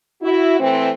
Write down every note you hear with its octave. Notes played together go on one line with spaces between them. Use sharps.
E4 F#4
E3 A3 C4